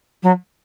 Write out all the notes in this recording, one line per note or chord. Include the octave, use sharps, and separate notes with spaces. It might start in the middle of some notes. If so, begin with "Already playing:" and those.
F#3